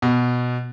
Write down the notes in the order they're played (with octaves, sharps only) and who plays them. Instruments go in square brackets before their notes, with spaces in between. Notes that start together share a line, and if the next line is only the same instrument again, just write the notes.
[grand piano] B2